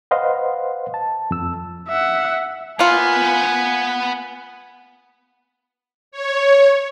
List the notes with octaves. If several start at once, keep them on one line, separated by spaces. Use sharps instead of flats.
B4 C5 D#5 F5 F#5 C6
A5
F2 E6
E5 F#5
A#3 B3 F4 B4 G#5
C#5